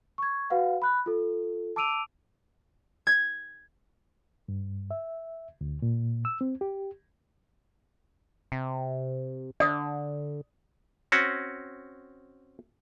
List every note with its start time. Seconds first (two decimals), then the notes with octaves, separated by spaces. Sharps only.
0.18 C#6 G#6
0.50 F#4 B4 F5 F#5
0.82 B5 F#6
1.06 F4 A4
1.76 A5 D6 E6 D7 D#7 F7
3.07 G#6
4.48 G2
4.91 E5
5.61 D2
5.82 A#2
6.25 E6
6.41 C4
6.61 G4
8.52 C3
9.60 D3 D5 D#6
11.12 C4 C#4 F#4